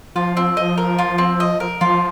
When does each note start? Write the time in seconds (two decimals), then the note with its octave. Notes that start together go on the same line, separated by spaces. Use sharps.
0.16 F3 F4
0.37 C4
0.57 D#5
0.77 A#4
0.99 F4
1.18 C4
1.40 D#5
1.60 A#4
1.81 F3 F4